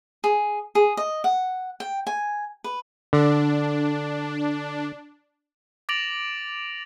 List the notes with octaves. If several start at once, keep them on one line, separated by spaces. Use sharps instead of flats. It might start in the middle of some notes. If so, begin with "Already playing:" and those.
G#4
G#4
D#5
F#5
G5
G#5
B4
D3 D4
D6 A6 A#6 D7 F7 F#7